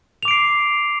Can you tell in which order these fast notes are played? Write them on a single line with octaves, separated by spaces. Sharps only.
F7 D6 D7 C7